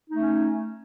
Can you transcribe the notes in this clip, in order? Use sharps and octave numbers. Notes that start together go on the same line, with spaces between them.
A3 C#4 D#4